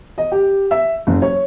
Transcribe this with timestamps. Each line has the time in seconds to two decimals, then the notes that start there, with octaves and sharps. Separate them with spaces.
0.18 D#5
0.32 G4
0.71 E5
1.07 F#1
1.22 C#5